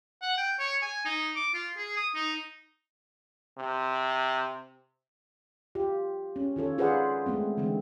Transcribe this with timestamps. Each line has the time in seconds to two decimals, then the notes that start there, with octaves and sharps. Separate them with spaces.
0.22 F#5
0.38 G5
0.59 C#5
0.82 G#5
1.05 D#4
1.36 D6
1.54 F4
1.77 G#4
1.97 D#6
2.15 D#4
3.58 C3
5.75 F4 G4
6.36 C#4
6.56 D#3 F4 A4 C#5
6.78 F4 G#4 B4 C5 D5 F#5
7.26 G#3 A3 B3 C4
7.57 D3 E3 G#3 C4